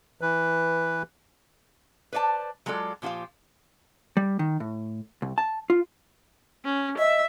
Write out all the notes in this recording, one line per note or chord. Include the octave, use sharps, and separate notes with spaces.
E3 B4
B4 C5 D5 F5 A5
F#3 G#3 F4 A4 D5
A#2 F3 F4 G4 F5
G3
D#3
A2
C2
A5
F4
C#4
D#5 E5